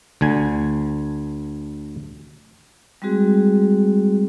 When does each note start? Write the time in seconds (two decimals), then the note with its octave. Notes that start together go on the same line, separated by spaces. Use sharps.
0.21 D2 D3 G#5
3.02 G3 G#3 C4 F#4 G#4